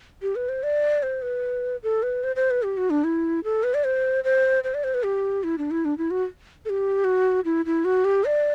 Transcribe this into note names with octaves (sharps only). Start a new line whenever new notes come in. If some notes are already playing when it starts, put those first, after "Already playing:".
G4
B4
C5
D5
C5
B4
A4
B4
C5
C5
B4
G4
F#4
D4
E4
A4
B4
D5
C5
C5
C5
D5
C5
B4
G4
E4
D4
E4
D4
E4
F#4
A4
G4
F#4
E4
E4
F#4
G4
D5